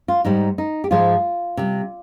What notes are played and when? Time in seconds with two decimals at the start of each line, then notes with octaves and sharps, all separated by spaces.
0.08 F4
0.24 G#2 G3 D#4
0.58 D#4
0.84 G4
0.91 G#2 F3 G#3 F4
1.57 C3 G3